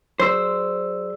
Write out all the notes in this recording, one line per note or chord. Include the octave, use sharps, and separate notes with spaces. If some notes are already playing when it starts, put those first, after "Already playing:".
F#3 G#4 C5 D5 E6